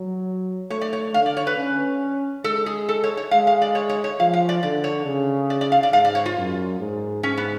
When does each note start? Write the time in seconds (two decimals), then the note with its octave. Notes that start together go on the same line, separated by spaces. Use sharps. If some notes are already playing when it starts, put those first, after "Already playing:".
Already playing: F#3
0.70 A3 C#5
0.81 D5
0.93 C#5
1.14 D3 F5
1.26 D5
1.37 C#5
1.47 B4
1.57 C#4
2.44 G#3 A4
2.66 G#4
2.89 A4
3.04 C#5
3.17 C#5
3.31 G#3 F5
3.47 F5
3.62 D5
3.75 C#5
3.89 C#5
4.04 C#5
4.20 F3 F5
4.33 F5
4.49 D5
4.63 D3 D5
4.84 C#5
5.06 C#3
5.50 D5
5.61 D5
5.72 F5
5.83 D5
5.93 G#2 F5
6.05 D5
6.15 C#5
6.26 F4
6.37 F#2
6.80 G#2
7.23 G#2 C#4
7.37 B3